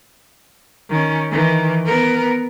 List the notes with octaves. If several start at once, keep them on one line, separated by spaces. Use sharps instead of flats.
D#3 C#4
D#3 E3
B3 A#4